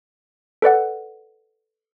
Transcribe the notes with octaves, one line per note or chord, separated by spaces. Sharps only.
A4 B4 D5 F#5